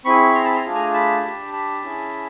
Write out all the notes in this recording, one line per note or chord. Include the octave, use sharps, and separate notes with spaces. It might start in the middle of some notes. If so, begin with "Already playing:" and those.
C4 E4 G#4 B5 C#6
A#5 C6
A5 B5
A#5 C6
A3 D4 F4 G#4
G#5 A#5
A5 B5
D4 G4
A5 B5
C#4 E4 G#4